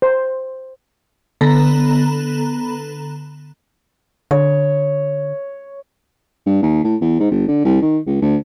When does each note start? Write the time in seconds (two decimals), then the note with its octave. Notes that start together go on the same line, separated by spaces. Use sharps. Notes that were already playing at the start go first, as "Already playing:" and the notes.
0.02 C5
1.41 D3 B3 A4 A#5 B5
4.31 D3 C#5
6.47 G2
6.63 D#2
6.84 A2
7.01 E2
7.20 G#2
7.31 G1
7.48 D3
7.65 C2
7.82 D#3
8.06 C#2
8.22 D2